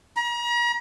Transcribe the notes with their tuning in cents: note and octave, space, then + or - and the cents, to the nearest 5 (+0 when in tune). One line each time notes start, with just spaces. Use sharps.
A#5 +40